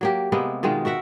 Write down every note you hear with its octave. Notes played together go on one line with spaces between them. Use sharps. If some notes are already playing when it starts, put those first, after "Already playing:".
F#3 A#3 G4
C3 G#3 A#3 B3
B2 D#3 G#3 F4
F#4 A#4 E5 F#5